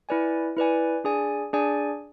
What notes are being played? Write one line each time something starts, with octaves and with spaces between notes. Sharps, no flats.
E4 B4 D5 G#5
E4 B4 D5 G#5
D4 G#4 D5 G#5
D4 G#4 D5 G#5